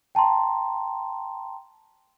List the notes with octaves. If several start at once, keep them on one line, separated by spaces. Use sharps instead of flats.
G5 A5 A#5 C6